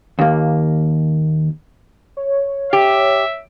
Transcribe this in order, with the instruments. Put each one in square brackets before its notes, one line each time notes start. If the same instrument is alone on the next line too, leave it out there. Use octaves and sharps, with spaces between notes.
[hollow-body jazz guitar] D#2 A#3
[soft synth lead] C#5
[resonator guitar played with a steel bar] G4 [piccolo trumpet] E5